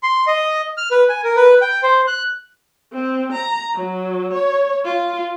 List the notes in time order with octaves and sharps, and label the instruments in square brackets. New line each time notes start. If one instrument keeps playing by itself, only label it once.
[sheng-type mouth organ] C6
D#5
F6
B4
G#5
A#4
B4
G5
C5
F#6
[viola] C4
A#5
F#3
C#5
F4